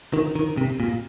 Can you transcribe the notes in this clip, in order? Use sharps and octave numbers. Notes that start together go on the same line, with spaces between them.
D#3
D#3
C3
A#2